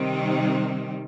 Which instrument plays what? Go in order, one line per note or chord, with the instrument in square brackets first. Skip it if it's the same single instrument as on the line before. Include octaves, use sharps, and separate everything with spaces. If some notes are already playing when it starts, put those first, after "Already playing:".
Already playing: [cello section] C3 D#3 G3 C4 D#4